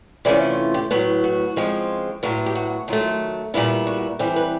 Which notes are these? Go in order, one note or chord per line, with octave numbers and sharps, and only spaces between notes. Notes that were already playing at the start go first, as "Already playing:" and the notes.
C3 E3 A3 C#4 F4 D5
G4
A2 F#3 B3
F#4
C#3 F3 G#3 C4 F4
A2 F#3 B3 F4
G4
F#4
D#3 F#3 A3 F4
A#2 G3 B3 E4 F4
F#4
E3 G3 C4
B4